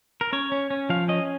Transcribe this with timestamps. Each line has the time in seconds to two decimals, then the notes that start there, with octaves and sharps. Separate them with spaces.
0.21 A#4
0.33 C#4 C#5
0.52 C#4
0.70 C#4
0.89 F3 F5
1.08 C#4 D#5